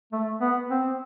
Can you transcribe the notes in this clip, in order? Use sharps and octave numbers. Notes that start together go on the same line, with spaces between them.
A3
B3
C4